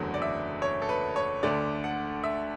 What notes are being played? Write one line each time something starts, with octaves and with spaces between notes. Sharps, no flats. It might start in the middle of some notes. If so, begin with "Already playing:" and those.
Already playing: F#1 E2 D3 F#3 A3 F#5
D5
E5
C#5
A4
B4
C#5
D2 D3 A3 D5
F#5
E5